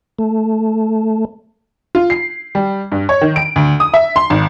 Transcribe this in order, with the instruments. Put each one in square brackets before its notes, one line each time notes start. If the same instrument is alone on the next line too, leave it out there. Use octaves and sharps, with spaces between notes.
[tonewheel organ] A3
[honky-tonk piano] F4
C7
G3
G2
C#5
D#3
D7
D2
D#6
E5
C6
G#1